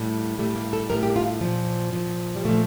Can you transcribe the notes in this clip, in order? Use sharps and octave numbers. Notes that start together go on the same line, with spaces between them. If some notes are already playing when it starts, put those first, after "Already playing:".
Already playing: A2 G3
A2 G3 A3
A#3
A4
A2 G3 A#4
G4
F4
A#2 F3
A#2 F3
G3
A#2 F3 A3